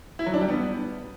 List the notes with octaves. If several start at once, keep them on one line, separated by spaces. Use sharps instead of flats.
E4
F#3
D4
G3
B3